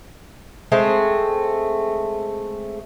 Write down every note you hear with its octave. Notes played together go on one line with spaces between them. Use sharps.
G#3 A3 C4